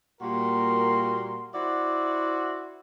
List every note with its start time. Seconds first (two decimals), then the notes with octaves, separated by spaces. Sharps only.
0.21 A#2 G3 A#3 F#4 A#4 C6
1.54 E4 F#4 C5 D5 E5 F#5